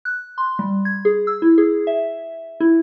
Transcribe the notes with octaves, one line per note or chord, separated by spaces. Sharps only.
F#6
C6
G3
G#6
G#4
E6
E4
G#4
E5
E4